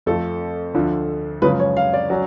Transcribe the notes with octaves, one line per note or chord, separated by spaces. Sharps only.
F2 F3 A3 A4
D2 D3 F3
F#2 C#3 F3 G#3 B4
C#5
F5
D5
F#3 C#4 F#4